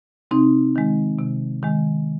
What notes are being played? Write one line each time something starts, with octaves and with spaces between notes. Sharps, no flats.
C3 C4 D#4
D#3 G#3
C3
D#3 G#3